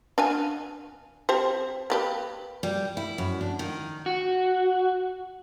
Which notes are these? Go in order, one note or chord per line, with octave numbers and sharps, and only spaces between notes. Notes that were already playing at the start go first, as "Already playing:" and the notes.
D4 F5 G#5
C4 G4 C5
A#3 G4 B4
G3
E4
F#2
D4
D#3
F#4